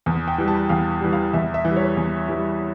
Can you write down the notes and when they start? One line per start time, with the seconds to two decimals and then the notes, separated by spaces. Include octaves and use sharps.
0.06 E2
0.28 G5
0.38 E3 G3
0.48 A5
0.69 E2 F5
1.01 E3 G3
1.13 F5
1.33 E2 E5
1.54 E5
1.65 E3
1.70 G3
1.76 C#5
1.97 E2
2.28 E3 G3